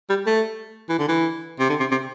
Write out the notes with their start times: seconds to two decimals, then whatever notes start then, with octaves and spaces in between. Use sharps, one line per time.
0.09 G3
0.26 A3
0.89 E3
0.99 D3
1.08 E3
1.59 C3
1.69 D3
1.80 C3
1.91 C3